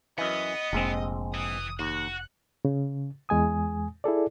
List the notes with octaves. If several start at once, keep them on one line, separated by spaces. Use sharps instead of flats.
F#2 E3 B3 D#5
F1 A#1 G#3 C4
E3 D#6
D#2 F#4 F#6
C#3
E2 G#3 G#5 D#6
E4 G#4 A4 D5